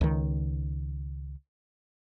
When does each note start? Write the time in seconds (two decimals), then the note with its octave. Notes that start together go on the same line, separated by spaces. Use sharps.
0.01 C#2 D#3